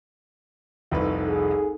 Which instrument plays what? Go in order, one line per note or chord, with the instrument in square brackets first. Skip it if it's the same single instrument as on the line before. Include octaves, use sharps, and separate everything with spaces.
[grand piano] F1 C2 B4 [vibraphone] D#4 A4
[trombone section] G#4